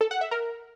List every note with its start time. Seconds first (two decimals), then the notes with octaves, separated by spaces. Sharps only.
0.01 A4
0.11 F#5
0.21 E5
0.31 A#4